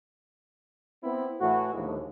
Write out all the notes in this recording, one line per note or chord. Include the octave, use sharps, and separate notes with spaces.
B3 C4 E4
A2 E3 A3 F#4
D#2 A#2 D3 F3 G#3 A3